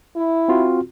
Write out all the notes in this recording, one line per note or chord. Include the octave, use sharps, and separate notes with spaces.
E4
C4 F4 F#4